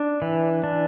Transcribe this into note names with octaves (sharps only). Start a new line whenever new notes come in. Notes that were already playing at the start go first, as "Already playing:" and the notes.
Already playing: D4
E3
D4